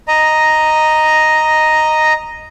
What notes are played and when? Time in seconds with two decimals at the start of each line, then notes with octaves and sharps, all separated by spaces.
0.08 D#5 A#5